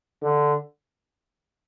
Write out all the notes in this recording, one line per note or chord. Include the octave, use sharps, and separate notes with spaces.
D3